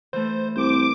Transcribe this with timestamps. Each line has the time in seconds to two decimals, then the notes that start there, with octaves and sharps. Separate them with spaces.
0.13 E3 A3 C5
0.56 C2 C5 D6